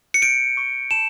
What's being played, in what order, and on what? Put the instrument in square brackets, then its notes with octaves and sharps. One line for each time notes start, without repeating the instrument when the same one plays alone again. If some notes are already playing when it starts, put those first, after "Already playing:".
[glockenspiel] C#7
G6 D7
C#6
A5 E7